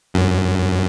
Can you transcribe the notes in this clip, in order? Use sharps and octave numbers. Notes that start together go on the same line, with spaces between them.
F#2